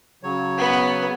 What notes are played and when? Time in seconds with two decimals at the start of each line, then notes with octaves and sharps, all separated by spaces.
0.23 C#3 F#3 C#5
0.58 B3